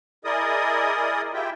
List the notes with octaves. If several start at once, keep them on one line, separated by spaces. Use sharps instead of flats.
E4 G#4 A#4 D5 D#5 D#6
E4 F4 G4 E5 G5